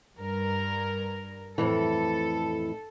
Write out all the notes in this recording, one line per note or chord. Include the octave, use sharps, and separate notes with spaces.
G2 A#4
F2 A2 E3 A4